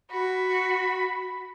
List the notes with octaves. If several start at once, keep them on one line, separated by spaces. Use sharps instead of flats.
F#4 B5